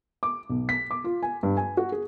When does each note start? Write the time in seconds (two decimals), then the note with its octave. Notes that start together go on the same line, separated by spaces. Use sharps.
0.23 D6
0.49 B1
0.69 B6
0.91 D6
1.04 F4
1.23 G#5
1.43 G2
1.57 G#5
1.77 F#4
1.92 G#4